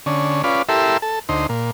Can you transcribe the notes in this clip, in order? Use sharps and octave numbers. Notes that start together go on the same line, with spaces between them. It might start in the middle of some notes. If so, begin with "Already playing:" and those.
D3 C#4
C#4 F4 B4 D5
E4 G4 A4 A#4 E5 C6
A4
D2 D#4 C5
A#2